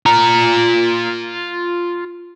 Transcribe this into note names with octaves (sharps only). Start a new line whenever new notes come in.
F4 A#5